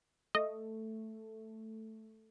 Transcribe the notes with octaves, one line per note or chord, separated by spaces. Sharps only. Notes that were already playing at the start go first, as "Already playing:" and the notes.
A3 D#5